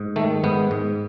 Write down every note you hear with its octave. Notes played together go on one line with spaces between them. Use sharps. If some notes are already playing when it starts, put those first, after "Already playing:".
Already playing: G#2
D#3 A3
G#2 B3
G#2